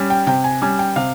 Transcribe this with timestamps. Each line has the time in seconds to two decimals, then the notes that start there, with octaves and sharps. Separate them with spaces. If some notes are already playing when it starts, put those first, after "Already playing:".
Already playing: G3 C#4
0.10 G5
0.27 C3 G5
0.44 G#5
0.62 G3 C#4 G#5
0.79 G5
0.96 C3 F5